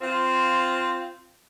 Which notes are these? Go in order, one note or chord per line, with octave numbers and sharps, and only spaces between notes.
C4 F4